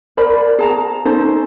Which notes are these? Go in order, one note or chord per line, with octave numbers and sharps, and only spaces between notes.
A#4 C5 D5 B5
G#4 A5 A#5
C#4 D#4 A4 C5